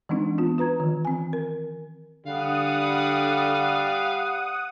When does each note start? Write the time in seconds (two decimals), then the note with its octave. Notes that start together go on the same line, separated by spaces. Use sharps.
0.09 E3 G#3 C4 D4 D#4
0.38 B3 F4
0.58 F4 B4 A#5 G#6
0.80 D#3 E3
1.05 C4 G#5
1.33 A#4
2.26 D3 G3 F5 F#5 D#6